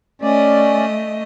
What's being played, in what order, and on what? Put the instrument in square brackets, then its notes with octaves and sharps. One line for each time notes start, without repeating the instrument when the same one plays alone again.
[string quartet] A3 D#5 [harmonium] C#4 D5